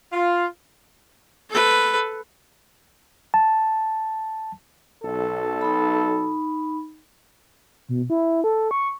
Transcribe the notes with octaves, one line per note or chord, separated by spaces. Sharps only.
F4
A4 B4
A5
B1 A4
D#4 B5
B2
E4
A4
C#6